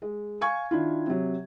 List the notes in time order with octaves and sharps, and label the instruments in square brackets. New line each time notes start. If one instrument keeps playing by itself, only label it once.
[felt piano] G#3
F5 G#5 C#6 G#6
D#3 D4 E4 F4
C3 F#3